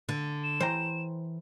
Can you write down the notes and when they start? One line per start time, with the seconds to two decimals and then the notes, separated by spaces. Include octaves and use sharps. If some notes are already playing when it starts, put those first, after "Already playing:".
0.09 D3
0.44 E7
0.60 E3 C5 G5 A#5